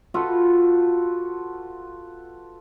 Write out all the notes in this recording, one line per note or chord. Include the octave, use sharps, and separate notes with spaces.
F4 F#4 A4 B4